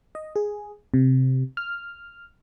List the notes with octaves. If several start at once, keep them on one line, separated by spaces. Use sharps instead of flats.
D#5
G#4
C3
F6